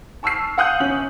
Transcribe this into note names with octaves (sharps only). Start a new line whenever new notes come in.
A5 C#6 E6 F6 C7
F5 F#5 D#6 F#6 G6
G1 C#4 F#7